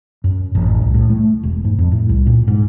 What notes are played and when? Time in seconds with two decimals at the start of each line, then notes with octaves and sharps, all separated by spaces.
0.24 F#2
0.55 A1
0.82 C2
0.94 A2
1.10 A3
1.43 E1
1.64 G#2
1.79 F2
1.92 A2
2.09 C2
2.27 A#2
2.48 G#2